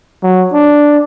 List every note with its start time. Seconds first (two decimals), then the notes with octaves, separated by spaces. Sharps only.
0.23 F#3
0.53 D4